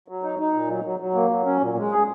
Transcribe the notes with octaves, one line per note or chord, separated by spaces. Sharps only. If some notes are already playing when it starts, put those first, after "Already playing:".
F#3
D#4
D#4
A#2
F#3
F#3
F#3
A#3
F#3
C#4
A#2
G#3
G#4